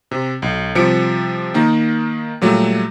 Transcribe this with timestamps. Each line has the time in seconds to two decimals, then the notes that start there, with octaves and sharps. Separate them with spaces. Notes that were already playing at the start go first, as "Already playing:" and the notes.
0.11 C3
0.42 B1
0.75 C3 F3 G3 C#7 D7
1.54 D#3 A#3 D#4
2.41 A#2 F#3 G3 A3